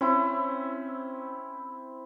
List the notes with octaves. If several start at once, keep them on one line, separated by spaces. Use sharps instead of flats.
C4 C#4 E4